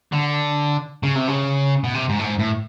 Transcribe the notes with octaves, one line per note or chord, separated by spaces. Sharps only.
D3
C#3
C3
C#3
B2
C3
G#2
A2
G#2
A2